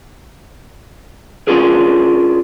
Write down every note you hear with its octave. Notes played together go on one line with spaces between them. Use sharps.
C#4 D4 F4 G#4 A#4